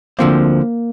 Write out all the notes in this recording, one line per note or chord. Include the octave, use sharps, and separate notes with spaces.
D2 D3 F3 A#3 C4